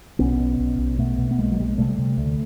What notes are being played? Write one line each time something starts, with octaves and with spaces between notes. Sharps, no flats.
B1 B3 C#4
B2
B1
B1
B2 A3 B3
B2
B3
B1 G#3 A#3
F#3
B2 G3
G#3
C3 G3 A3
C3
D2